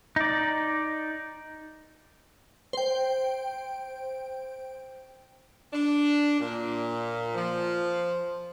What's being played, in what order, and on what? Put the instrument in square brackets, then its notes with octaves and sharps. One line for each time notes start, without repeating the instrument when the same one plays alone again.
[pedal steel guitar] D#4 D5
[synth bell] C5 G5
[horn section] D4
A#2
F3